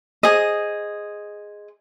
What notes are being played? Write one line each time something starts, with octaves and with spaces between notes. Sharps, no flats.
G#4 C5 D#5